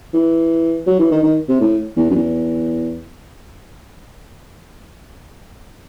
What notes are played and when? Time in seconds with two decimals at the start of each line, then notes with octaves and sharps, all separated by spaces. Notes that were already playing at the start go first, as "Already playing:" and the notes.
0.14 E3
0.87 F#3
0.99 E3
1.11 D#3
1.23 D#3
1.49 C3
1.61 A2
1.97 E2
2.10 F#2
2.15 E2